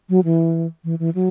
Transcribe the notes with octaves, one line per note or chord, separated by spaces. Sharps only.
F#3
E3
E3
E3
F#3